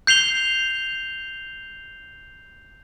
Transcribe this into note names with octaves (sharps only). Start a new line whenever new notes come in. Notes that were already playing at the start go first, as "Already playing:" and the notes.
G6 C7 F7 G7